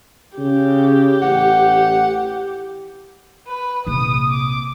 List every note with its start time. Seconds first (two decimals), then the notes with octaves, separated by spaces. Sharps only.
0.38 C#3 G4
1.22 A1 F#5
3.47 B4
3.87 A#1 C3 D#6
4.31 D6